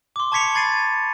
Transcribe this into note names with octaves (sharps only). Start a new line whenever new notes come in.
C6 D6
A5 C#6 G#6 B6 C#7 F7
B5 G#6 A6 C7 D#7